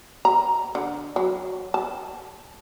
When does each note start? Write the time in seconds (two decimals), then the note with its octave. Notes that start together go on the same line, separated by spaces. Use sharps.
0.25 A#5
0.75 D3
1.16 F#3
1.74 A5